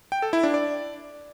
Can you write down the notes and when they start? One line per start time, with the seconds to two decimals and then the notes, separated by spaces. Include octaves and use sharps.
0.12 G5
0.22 A4
0.33 E4
0.43 D4
0.54 D5